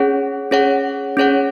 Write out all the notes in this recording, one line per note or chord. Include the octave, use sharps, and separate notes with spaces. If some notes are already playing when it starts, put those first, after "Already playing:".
Already playing: C#4 G#4 C#5 F#5
C#4 G#4 C#5 F#5
C#4 G#4 C#5 F#5